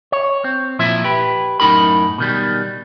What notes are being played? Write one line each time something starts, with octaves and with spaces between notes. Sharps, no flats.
C#5
C4
A#2 F3 E4 E5
G4 B4
F#2 A2 D#4 A#4 B5
B2 D#3 G3